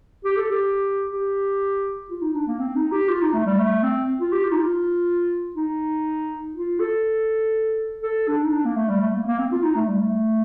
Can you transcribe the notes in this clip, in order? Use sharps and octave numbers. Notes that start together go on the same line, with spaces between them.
G4
A4
G4
G4
F4
D#4
D4
A#3
C4
D#4
G4
F4
D#4
A3
G3
A3
C4
F4
G4
F4
D#4
F4
D#4
F4
A4
A4
D4
D#4
D4
A#3
A3
G3
A3
A#3
A#3
C4
F4
D#4
A3
G3
A3